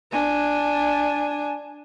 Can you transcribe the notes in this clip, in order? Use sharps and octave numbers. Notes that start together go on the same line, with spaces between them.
D4 G#5